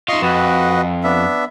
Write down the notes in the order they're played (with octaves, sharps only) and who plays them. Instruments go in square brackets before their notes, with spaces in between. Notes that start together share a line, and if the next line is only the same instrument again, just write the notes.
[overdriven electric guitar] D#4 F4 [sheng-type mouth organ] D#5 C6 C#6
[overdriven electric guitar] F2 [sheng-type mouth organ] F#4 B4 D#5
[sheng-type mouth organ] B3 D4 E5